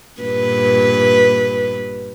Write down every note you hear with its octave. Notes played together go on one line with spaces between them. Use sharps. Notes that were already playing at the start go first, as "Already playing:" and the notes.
G2 A#2 B4